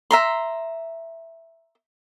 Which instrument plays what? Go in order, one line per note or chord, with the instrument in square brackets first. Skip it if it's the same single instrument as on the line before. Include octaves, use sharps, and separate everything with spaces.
[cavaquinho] E5 A#5 C6